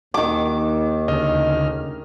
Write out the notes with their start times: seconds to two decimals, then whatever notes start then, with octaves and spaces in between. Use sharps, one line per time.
0.14 D#2 D#3 D6
1.08 D2 C#3 D#5 F6